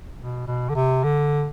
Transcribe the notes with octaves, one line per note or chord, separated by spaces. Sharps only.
B2
B2
D3
C3
D3